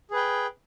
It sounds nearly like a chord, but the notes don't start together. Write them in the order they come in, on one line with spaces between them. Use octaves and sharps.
G#4 B4 G5